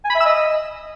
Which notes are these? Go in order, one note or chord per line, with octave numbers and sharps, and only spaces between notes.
G#5
B5
E5
E6
D#5